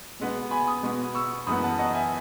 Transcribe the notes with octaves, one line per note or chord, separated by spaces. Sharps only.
B2 G#3 B3
G#5 B5
B5 D#6
B2 G#3 B3
C#6 E6
F#2 E3 G#3 B3 B5 D#6
F#5 A5
D#5 F#5
E5 G#5